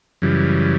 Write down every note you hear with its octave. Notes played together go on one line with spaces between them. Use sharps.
F#2 C#3 E3 G3